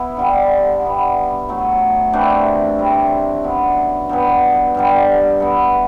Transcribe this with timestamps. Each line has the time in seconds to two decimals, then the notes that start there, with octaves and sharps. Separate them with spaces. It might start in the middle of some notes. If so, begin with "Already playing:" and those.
Already playing: B3 E4
0.17 D3 G3 D4
0.83 G3 B3 E4
1.48 A2 F#3 A3
2.13 C3 E3 A3 D4
2.78 A2 G3 C4
3.44 F#2 E3 B3 D4
4.09 G2 F#3 B3
4.75 G2 D3 G3
5.40 E3 B3 E4 A4